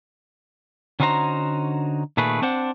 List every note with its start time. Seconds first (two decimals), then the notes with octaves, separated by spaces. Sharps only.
1.00 D3 C#4 D#4 F#4 C5 A#5
2.17 A#2 D#3 A3 G#4 B4
2.42 C4 D4 C5 F#5